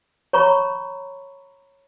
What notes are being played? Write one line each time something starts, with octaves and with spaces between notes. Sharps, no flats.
C#5 A#5 B5 C#6